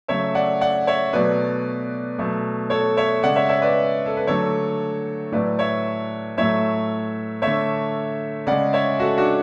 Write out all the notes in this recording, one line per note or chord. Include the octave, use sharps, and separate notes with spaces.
C#3 F#3 A3 C#5 E5
D5 F#5
D5 F#5
C#5 E5
B2 F#3 A3 B4 D5
B2 F#3 A3
A4 C#5
C#5 E5
C#3 G#3 D5 F#5
C#5 E5
C#5 E5
B4 D5
A4
B4
D3 F#3 A3 A4 C#5
A2 F#3 A3 B4 D5
C#5 E5
A2 F#3 A3 C#5 E5
D3 A3 C#5 E5
C#3 G#3 D5 F#5
C#5 E5
F#4 A4
D4 F#4